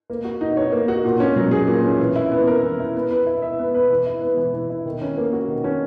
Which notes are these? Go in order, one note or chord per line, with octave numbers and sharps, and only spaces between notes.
A#3
F#4
D#4
C#5
A#3
F#4
A#2
C#4
F#3
G#4
A#2
C#4
E3
E4
B3
A#4
E3
E4
B3
B4
E4
E5
B3
B4
E3
E4
B3
E3
E3
E4
D#3
C#4
A#3
F#4
D#3
C#4